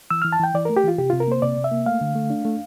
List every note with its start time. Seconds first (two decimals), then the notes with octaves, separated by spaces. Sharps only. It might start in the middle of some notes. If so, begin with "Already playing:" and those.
0.11 E3 E6
0.22 E3 F6
0.33 A5
0.39 E3 G5
0.54 E3 D5
0.65 A3 A#4
0.77 G4
0.84 E3 F4
0.98 C3 G4
1.10 C3 F4
1.20 A#4
1.28 A#3 C5
1.42 C3 D5
1.57 C3
1.64 E5
1.71 A#3
1.86 A3 F5
2.01 D3
2.15 A3
2.30 D4
2.45 A3